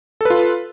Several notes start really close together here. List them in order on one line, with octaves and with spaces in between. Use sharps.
A4 B4 F4